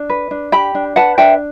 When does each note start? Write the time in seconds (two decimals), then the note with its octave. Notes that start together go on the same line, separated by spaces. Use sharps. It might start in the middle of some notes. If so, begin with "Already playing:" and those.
Already playing: D4
0.10 B4
0.31 D4
0.52 G4 G5 B5
0.75 D4
0.96 B4 F#5 A5
1.18 D4 E5 G5